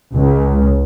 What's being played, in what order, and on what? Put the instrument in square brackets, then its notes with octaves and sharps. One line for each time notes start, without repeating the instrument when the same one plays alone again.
[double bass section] C#2